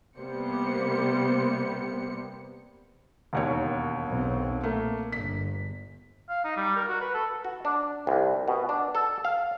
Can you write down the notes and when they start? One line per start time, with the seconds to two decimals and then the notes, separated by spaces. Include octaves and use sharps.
0.18 C3 G3 A#3 B3 C5 C#7
3.33 E1 D#2 C#5
4.06 B1 B2 C4
4.63 A#2 A3 A#3
5.12 G1 B6
6.29 F5
6.44 D#4
6.57 G3
6.76 A#4
6.88 F#4
7.01 B4
7.14 A4
7.45 F#4
7.65 D4
8.07 C2
8.48 B2
8.69 D4
8.95 A4
9.25 F5